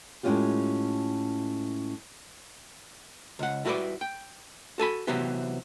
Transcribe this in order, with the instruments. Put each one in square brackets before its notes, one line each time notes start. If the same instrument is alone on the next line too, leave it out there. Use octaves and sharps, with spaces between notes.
[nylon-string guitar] A2 G#3 A#3 C#4 F4 G4
[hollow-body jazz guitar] C#2 F#5
G3 E4 F#4 A4 B4 D5
G5
F#4 A4 G#5 B5
C3 E3 F#3 B3 G4